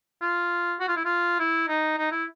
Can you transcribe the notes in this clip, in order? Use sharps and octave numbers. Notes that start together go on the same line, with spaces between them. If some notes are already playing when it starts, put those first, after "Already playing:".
F4
F#4
F4
E4
F4
E4
D#4
D#4
E4